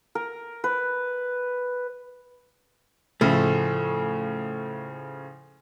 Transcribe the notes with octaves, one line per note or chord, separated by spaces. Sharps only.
A#4
B4
A2 C#3 F3 A3